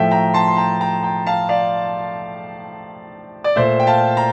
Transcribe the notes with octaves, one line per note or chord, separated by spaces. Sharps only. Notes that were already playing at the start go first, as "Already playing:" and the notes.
Already playing: A2 F3 A3 E5 G5
G5 A#5
A5 C6
C6
G5 A#5
G5 A#5
G5 A#5
F5 A5
D5 F5
D5
A#2 A3 C5 E5
G5
F5 A5
A#5